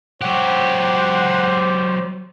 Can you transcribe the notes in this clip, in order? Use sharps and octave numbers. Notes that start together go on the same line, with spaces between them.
F#3 G4 C5 F#5